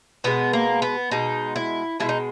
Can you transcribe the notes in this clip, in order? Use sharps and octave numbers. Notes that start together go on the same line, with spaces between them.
B2 G#3 B3
A#3
B3
B2 G#3 D#4
E4
B2 G#3 E4
D#4